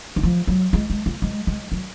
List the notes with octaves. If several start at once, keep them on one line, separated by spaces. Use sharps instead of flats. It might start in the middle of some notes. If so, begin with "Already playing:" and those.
D#3
F3
F#3
G#3
G#3
A#3
G#3
G#3
F#3